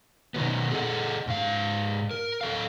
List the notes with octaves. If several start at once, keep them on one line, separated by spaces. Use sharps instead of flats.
B2 D#3 F#3 B3
G#4 A4 D5 D#5 F#5
G#2 F5
A#4
F#3 A4 F5